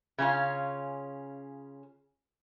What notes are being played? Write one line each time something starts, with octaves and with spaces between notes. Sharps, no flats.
C#3 C#4 F4